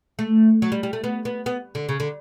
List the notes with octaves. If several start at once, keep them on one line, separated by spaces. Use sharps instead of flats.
A3
F#3
G3
G3
A3
B3
B3
B3
D3
C#3
D3